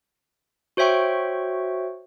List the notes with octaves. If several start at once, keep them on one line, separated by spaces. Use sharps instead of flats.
F#4 C5 C#5 E5 G5 C#6